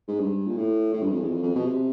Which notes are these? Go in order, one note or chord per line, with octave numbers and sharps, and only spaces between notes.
G#2
G2
A#2
A2
A2
G2
F2
E2
F2
F2
B2
C3